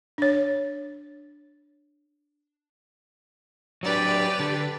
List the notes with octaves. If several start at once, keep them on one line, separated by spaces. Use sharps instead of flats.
D4 C#5
F#3 D4 G4 B4 D5
D3